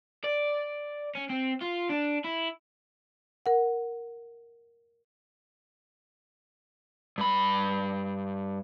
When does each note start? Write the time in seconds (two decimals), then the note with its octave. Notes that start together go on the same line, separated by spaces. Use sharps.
0.24 D5
1.15 C#4
1.29 C4
1.61 F4
1.89 D4
2.24 E4
3.46 A#4 F#5
7.18 G2 B5